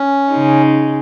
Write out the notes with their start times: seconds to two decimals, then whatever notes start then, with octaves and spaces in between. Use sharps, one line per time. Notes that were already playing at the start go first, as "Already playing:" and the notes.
Already playing: C#4
0.32 C#3 G#3 D#4